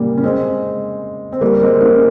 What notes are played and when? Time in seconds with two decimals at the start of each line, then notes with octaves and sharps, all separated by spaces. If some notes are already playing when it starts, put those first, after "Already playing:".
Already playing: A#2 C#3 G3 A#3
0.17 C#4
0.23 G#3 C4
1.32 C4
1.41 G3 A#3
1.61 G#3 C4
1.80 A#3 C#4